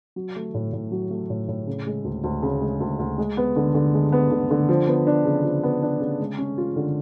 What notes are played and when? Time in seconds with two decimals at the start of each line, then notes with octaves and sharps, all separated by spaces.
0.16 F#3
0.36 A3
0.54 A2
0.73 A2
0.92 F#3
1.11 A3
1.30 A2
1.48 A2
1.67 C#3
1.87 G#3
2.05 D2
2.24 D2
2.42 C#3
2.61 G#3
2.80 D2
2.99 D2
3.18 G#3
3.37 B3
3.56 D3
3.74 D3
3.94 G#3
4.12 B3
4.31 D3
4.51 D3
4.69 F3
4.88 B3
5.07 D4
5.25 C#3
5.44 F3
5.63 B3
5.82 D4
6.00 C#3
6.20 G#3
6.38 C#4
6.58 F4
6.76 D3